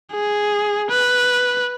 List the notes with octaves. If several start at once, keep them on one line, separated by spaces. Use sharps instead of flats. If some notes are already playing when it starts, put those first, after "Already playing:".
G#4
B4